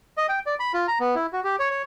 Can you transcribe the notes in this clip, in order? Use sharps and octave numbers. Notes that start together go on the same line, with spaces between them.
D#5
G5
D5
B5
F4
A#5
B3
E4
F#4
G4
C#5
C#5